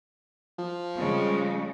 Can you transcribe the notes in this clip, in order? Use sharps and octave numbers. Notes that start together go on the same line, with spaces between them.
F3
C#3 G3 G#3